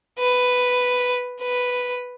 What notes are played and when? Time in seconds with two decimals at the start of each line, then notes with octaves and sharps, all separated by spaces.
0.19 B4
1.42 B4